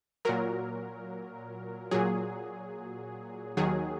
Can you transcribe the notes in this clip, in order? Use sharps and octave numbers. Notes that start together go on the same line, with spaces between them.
A#2 F#3 A#4
A#2 F#3 G#4
D#2 D#3 F#3 G#4